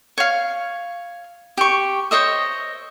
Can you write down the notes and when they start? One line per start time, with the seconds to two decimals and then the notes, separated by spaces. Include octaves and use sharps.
0.18 C#5 F5
1.57 G4 C#6
2.11 C5 C#5 D#5 E5